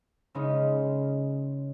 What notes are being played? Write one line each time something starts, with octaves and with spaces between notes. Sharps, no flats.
C#3 G#3 C#4 D#4